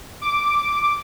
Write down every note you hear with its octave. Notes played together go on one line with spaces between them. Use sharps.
D6